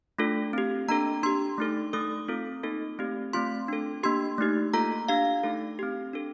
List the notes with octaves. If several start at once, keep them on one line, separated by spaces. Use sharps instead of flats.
A3 D4 F4 A4
C4 G4
A#3 D4 A4 A#5
D4 G4 C6
A3 D#4 A4
A3 D#4 A4 D#6
C4 F4 A4
A#3 D#4 A4
A3 C4 G4
A3 C4 F4 C6
D4 A4
A#3 D4 G4 C6
A3 D#4 G4
A#3 F4 A4 A#5
D4 G4 F5
A3 D#4 A4
C4 G4
D4 A4